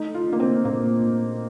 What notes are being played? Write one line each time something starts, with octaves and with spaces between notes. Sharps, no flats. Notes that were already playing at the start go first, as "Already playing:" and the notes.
Already playing: A3 D#4
F4
A#3 D4
C4
A#2 A#3
A#2